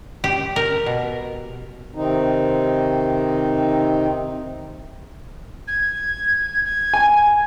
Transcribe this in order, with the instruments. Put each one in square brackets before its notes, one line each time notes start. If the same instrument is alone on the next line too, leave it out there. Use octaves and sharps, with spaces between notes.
[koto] G4
A#4
B2
[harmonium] C3 D#3 C4 D#4
[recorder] G#6
G#6
[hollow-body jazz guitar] G#5